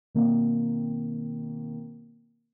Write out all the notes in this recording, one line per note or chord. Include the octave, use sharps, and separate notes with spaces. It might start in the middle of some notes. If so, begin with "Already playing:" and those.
B2 D#3 A#3 C4